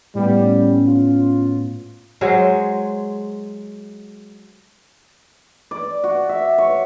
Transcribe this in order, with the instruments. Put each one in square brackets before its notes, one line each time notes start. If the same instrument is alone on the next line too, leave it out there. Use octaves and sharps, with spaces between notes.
[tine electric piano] A2 B3 [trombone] G3 [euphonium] C#4
[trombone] F4
[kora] F#3 G#3 C5
[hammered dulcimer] D5
F#4
E5
C#5